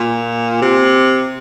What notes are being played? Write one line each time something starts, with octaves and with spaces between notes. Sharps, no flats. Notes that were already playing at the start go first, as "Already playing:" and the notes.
Already playing: A#2
C3